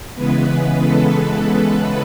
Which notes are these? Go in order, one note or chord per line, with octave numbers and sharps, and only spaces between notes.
C#3 E3 G#3 B3 B4
A4